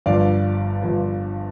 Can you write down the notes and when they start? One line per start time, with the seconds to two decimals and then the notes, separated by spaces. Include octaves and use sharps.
0.06 G1 G2 F3 D5 F5
0.83 G1 G2 F3